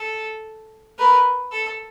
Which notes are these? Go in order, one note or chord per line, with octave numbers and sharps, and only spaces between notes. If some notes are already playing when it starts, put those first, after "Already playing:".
Already playing: A4
A#4 B4
A4